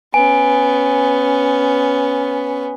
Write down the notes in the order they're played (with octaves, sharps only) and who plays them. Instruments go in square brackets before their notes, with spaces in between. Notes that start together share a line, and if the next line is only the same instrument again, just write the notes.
[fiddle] B3 C#4 [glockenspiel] G#5